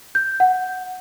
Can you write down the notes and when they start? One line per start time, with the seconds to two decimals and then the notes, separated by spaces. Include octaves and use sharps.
0.15 G6
0.40 F#5